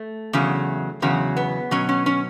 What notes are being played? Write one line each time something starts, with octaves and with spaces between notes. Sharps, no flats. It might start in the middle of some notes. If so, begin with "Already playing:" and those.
Already playing: A3
E2 C#3 F#3
E2 C#3 F#3
B3
B2 F#3 C#4
C#4
C#4